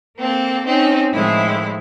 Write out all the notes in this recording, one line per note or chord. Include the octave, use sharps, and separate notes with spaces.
A#3 C4 A4
C4 C#4 D#4
A2 D#3 F3 G#3 A3 E4